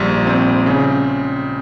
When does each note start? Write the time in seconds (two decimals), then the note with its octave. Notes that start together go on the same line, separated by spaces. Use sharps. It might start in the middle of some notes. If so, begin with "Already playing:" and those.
Already playing: A#1 G#2 G3
0.27 C4
0.66 C#3